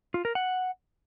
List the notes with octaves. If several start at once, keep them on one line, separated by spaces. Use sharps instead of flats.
F4
A#4
F#5